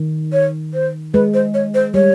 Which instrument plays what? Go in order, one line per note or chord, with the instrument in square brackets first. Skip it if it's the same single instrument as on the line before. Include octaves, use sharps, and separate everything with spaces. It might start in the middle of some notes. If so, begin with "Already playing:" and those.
Already playing: [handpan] D#3
[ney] C#5
C5
[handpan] G#3 [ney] B4
[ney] C5
C#5
C5
[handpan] G3 [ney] C#5